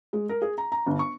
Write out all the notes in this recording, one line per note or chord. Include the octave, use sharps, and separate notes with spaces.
G#3
A#4
G#4
A#5
A#5
G1
C#6